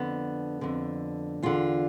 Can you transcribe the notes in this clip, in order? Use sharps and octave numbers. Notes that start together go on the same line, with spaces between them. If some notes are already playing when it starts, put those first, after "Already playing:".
Already playing: F2 D3 B3
F2 D3
E2 D3 F4